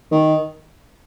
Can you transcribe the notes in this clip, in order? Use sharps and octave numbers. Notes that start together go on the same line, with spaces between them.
D#3